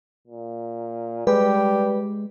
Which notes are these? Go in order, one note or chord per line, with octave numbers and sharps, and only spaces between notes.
A#2
G3 G#3 G4 B4